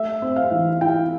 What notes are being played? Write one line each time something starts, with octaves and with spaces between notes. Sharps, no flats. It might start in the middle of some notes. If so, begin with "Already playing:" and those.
Already playing: A3 E5
C4
F5
E3
E4 G5